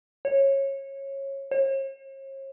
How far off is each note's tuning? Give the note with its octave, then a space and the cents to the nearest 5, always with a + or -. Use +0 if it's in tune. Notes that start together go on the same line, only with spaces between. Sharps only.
C#5 -20
C#5 -45